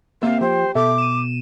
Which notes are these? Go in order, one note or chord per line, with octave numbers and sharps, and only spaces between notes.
A#3 C4 G4 E5 F5
F3 G4 C5 G5
B2 A4 E5 D6
D#7 E7